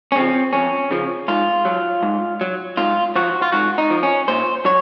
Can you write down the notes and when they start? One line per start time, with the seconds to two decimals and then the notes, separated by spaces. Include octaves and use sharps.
0.12 C#4
0.15 C#3 F3 C4
0.53 F2 C#4
0.91 C#3 F3
1.28 G#2 F4
1.65 F#3
2.03 G#2
2.41 F#3
2.77 G#2 F4
3.16 F3 F#4
3.42 F4
3.52 G#2 F#4
3.78 D#4
3.90 F3
4.03 C#4
4.28 A#2 C5
4.65 F#3 C#5